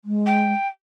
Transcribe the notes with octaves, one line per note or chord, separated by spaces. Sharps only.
G#3
G5